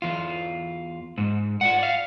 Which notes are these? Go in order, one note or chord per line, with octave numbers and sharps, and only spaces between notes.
E2 F4
G#2
F4 D5 F#5
D5 F5